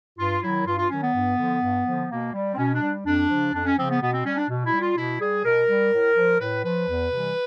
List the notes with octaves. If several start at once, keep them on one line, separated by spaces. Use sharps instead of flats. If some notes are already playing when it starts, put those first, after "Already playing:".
G2 F4
D#3 F#3 E4
G2 F4
F4
D#3 F#3 C#4
B3
G2
D3 F3
G2
D3 F3
B2 A#3
G3
C4
B2 C#4
D4
G3
F2 D4
C#3 F3
F2 D4
C#4
C#3 F3 C4
B3
B2 B3
C4
G3 C#4
D4
B2
E4
G3
F4
B2 E4
G3 G#4
B2 A#4
G3
A2
F3
A2 B4
F3 B4
E2
C3 E3 G3